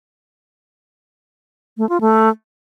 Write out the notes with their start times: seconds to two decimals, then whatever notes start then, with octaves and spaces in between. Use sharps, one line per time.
1.78 A3
1.89 F4
2.01 A3